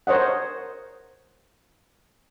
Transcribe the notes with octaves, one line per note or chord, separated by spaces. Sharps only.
A#4 C5 C#5 D#5 F#5